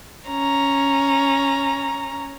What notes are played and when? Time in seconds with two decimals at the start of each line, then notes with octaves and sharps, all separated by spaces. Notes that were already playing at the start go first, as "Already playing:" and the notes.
0.29 C#4 A#5